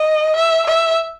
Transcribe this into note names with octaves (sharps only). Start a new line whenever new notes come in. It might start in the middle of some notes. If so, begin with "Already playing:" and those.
Already playing: D#5
E5
E5